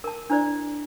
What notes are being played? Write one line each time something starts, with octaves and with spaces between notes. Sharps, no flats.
A#4 A5
D4 E4 C5 D5